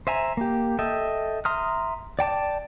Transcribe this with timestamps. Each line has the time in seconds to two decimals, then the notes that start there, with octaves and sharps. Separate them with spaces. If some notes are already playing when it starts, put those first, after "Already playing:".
0.07 C5 E5 G#5 A#5
0.37 A#3 G4
0.79 A4 D#5 E5 G5
1.45 E5 A#5 C6 D#6 F6
2.19 D5 G5 A5 D6